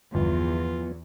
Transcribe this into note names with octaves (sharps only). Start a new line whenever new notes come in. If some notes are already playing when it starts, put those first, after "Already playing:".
G1 E2 F3 B3 F4